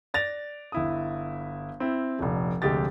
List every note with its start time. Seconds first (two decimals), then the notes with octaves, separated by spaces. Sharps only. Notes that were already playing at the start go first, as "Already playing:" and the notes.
0.14 D5 A6 A#6 F7
0.72 G1 E4 D#6
1.80 C4 E4
2.19 F1 A#1 F2
2.62 F1 D2 G#3 G4 A6